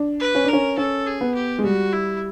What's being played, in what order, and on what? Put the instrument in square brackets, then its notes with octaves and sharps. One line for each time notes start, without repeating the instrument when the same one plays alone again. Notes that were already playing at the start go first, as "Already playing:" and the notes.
Already playing: [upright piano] D4
[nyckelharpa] B4
[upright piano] C#4
D4
[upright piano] C#4 [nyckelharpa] A#4
[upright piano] C#4 [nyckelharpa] A4
[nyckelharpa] G#4
[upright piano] B3
[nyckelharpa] G4
[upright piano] G#3
[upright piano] G3 [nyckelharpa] F#4
[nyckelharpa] E4